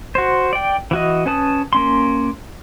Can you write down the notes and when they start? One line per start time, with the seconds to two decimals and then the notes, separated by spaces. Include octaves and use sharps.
0.15 F#4 C5
0.53 D5 G5
0.91 E3 F#4 D#5
1.26 C#4 B4 A5 D#6
1.73 A#3 C#4 C6